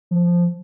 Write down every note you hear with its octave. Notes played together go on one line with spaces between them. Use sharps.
F3